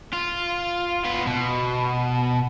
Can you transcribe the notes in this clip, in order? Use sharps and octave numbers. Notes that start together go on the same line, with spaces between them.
F4
B3 F4
B2